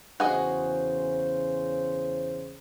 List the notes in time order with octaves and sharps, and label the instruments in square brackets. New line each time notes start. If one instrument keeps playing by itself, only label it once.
[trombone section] E2 C#3 C5 [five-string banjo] F#4 G#4 D#5